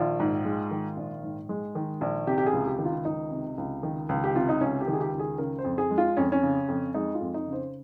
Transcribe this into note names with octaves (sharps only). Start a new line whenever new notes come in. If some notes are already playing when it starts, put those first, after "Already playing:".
Already playing: A#1 D#3 F4
G#2
G#3
D#3
A#1
G#2
G#3
D#3
A#1
C3 G4
G4
G#4
C#2
G4
D#3
F4
C#2 D#4
C3
C#2
D#3
C#2
G4
C3 F4
D#4
C#2 C#4
G4
D#3
G#4
G4
C#2
G#4
C#3 A#4
C5
F2
G#4
G#3
F4
F2 C#4
C#4
C#3
F2
G#3 D#4
F4
F2
D#4
C#3
C5